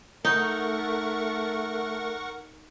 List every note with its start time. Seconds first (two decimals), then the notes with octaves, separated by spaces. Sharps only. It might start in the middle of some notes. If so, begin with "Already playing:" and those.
0.25 A3 D#4 A#4 F#5 C#6